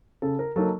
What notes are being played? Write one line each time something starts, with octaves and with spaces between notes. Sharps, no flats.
C#3 A4
A#4
F#3 A#3 D#4 A4